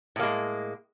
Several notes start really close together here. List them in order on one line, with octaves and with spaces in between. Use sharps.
A2 A#3 G#3